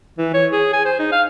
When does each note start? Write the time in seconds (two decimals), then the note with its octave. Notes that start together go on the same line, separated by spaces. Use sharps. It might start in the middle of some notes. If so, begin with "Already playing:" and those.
0.18 E3
0.34 C#5
0.52 G#4
0.73 G#5
0.85 C5
0.99 D#4
1.12 F5